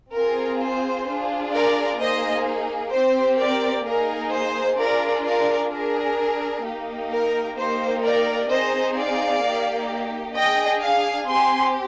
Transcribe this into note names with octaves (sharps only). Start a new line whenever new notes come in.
C4 F4 G#4 A#4
C5
D4 F4 G#4
A#4 D5
A#3 D#4 G#4 C5 D#5
C4 G4 C5
A#4 D5
A#3 D#4 G#4 A#4
C5
D4 F4 G#4 A#4 D5
A#4 D5
D4 G#4 A#4
A#3 D#4 G4
A#4
A#3 D#4 G4 C5
A#4 D5
C4 D#4 G#4 C5 D#5
D5 F5
A#3 D#4 G4
D4 G#4 D#5 G5
F5 G#5
C4 G4 G#5 C6